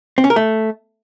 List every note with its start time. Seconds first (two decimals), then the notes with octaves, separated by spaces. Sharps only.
0.18 C4
0.24 C#4
0.30 A#4
0.36 A3